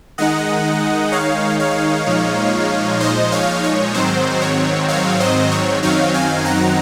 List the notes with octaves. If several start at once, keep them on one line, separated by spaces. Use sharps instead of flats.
D#3 G#3 D#4 D#5 F#5
C#5 F5
C#5 F5
A#2 F3 G#3 D#4
C5 D#5
C#5 F5
C#5
G#2 D#3 F#3 C4 C5
C#5
C#5 F5
C5 D#5
C#5
F#2 D#3 F#3 C4 D#4 C#5 F5
F5 G#5
F#5 A#5